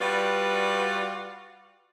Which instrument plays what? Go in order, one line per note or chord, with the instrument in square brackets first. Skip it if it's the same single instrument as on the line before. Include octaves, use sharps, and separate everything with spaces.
[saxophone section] G3 F4 F#4 B4 D5